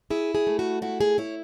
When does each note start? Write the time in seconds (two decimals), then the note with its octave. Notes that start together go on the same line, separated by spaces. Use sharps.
0.10 E4 G#4
0.35 G#4
0.47 A3
0.59 F#4
0.82 E4 F#4
1.00 G#4
1.18 E4 C#5